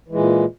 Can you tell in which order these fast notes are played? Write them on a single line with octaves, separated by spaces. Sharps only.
E3 G#3 A#2